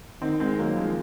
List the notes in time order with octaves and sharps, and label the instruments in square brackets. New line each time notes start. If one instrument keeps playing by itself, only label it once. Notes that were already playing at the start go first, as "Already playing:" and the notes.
[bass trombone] D#3 [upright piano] C4 D#4
[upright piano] G#3 C4
F#3 A#3
F3 G#3